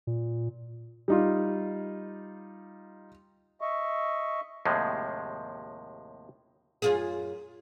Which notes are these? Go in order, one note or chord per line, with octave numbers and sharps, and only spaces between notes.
A#2
G3 D#4 F4
D#5 E5 C#6
D#2 A2 C3 F3 G#3
F#2 F4 G#4